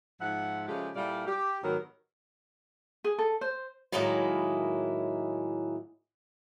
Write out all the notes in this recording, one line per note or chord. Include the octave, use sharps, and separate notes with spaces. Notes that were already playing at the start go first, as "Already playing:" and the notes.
G#2 F3 E5 F#5
C#3 F3 G#3 A3 F4 G4
A#2 G3 E4 A4 D5 F5
G4
G#2 D#3 F#3 B3 G4 A#4
G#4
A4
C5
A2 D#3 F#3 G#3 A#3 E4